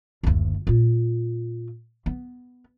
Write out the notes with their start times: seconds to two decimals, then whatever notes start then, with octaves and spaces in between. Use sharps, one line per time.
0.23 F#1 D2
0.67 A#2 F4
2.06 B3